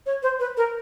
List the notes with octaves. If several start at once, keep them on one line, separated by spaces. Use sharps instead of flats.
C#5
C5
B4
A#4